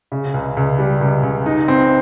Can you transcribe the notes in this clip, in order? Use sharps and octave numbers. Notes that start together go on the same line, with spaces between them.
C#3
C#2
C#2
G3
C#2
C#2
D#4
C4